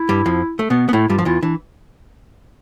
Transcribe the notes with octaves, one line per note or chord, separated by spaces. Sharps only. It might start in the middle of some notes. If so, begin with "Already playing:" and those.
Already playing: E4
G2 G3
F2 F3
A3
B2 B3
B3
A2 A3 E4
G2 G3 F4
F3
E2 E3 F4
E3 D4